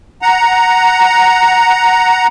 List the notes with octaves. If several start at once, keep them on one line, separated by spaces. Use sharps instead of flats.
F#5 A#5